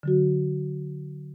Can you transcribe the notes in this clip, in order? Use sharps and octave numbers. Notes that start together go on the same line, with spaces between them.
D3 F#3 F#4